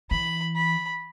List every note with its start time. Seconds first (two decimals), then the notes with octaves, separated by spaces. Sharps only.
0.11 E3 B5
0.56 B5